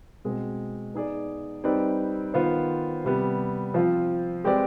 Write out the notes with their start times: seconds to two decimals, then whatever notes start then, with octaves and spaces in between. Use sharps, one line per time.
0.25 B2 G#3 C4
0.94 B3 D#4 G#4 D5
1.64 G3 C4 D#4 B4 D5
2.34 D#3 B3 F4 C5
3.04 C3 G3 B3
3.74 F3 C4 F4
4.44 G#3 C4 G4 B4 D5